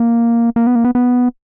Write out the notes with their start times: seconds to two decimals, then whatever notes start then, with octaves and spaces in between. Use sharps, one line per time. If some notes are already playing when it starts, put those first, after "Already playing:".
Already playing: A#3
0.56 A#3
0.67 B3
0.75 A#3
0.84 B3
0.95 B3